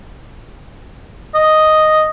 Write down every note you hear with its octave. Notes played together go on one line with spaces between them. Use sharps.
D#5